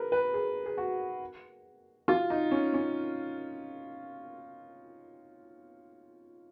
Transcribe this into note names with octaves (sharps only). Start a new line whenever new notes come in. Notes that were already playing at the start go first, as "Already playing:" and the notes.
Already playing: G#4 A#4 B4
B4
G#4
G#4
F#4
F4
D#4
C#4
C#4